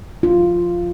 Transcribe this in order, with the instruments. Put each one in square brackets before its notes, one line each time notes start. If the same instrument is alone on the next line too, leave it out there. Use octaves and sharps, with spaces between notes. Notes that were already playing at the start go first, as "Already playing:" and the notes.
[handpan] F4